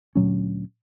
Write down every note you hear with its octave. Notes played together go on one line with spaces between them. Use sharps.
D2 A#2 F#3 C#4